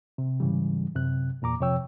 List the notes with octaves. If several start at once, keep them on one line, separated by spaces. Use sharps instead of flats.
C3
G#2 C#3 E3 G3
F#2 C3 F#6
E2 A#2 A#5 D6
F2 C3 F3 C#5 G5 E6